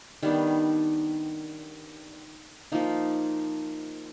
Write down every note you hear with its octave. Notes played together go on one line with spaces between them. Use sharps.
D#3 G3 B3 D4
F3 A#3 D#4